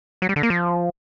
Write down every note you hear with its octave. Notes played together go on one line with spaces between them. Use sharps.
F#3
G3
D3
A#3
F3